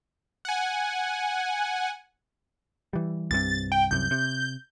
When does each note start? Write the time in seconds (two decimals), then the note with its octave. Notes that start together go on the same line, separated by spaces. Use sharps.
0.45 F#5 G#5
2.93 E3 G3
3.31 C2 G2 C3 A6
3.72 G5
3.91 C2 F#2 C3 G6
4.11 C3